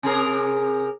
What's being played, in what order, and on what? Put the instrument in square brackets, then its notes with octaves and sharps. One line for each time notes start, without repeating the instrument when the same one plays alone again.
[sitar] C3 G#4 A#4